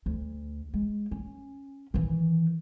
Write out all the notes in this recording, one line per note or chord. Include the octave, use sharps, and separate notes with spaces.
D2
G#3
C#4
D#3 E3